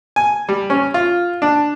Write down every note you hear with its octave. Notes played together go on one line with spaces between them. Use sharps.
G#5
G3
C#4
F4
D4